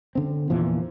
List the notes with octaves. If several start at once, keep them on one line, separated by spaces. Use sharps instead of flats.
D3 C4
E2 A#2 E3 F3